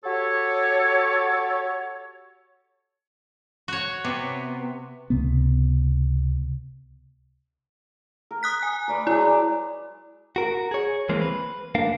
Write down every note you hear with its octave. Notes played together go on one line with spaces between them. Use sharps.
F#4 G4 A4 C#5
F#4 C#5
C3 B3
C#2 C3 B3
A#4
D#6 F#6 B6
G#5
B4 D5 A#5
F#3 G#3 E4 D5
F#4 A#4
G#4 C#5
E3 G#3 A#3 C4
B4
A#3 D4 A#4 F5